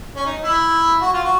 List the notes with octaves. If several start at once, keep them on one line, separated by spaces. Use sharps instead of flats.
C#4
D#4
E4
F#4
F4
F#4